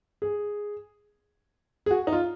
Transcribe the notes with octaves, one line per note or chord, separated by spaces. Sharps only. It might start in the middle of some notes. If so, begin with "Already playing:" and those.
G#4
G#4
F#4
D#4
F4